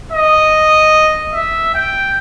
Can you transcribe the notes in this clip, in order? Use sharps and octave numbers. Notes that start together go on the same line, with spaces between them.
D#5
E5
G5